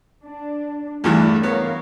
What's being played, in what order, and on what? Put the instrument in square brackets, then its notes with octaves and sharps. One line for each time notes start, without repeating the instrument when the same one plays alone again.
[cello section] D4
[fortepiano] E2 G2 E3 [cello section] A3 D4
[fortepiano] B3 [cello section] A#4 C#5 F5